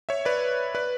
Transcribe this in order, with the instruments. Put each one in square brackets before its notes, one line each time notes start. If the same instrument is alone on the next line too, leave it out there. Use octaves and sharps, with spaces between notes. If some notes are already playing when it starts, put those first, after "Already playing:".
[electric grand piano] C#5 E5
B4 D5
B4 D5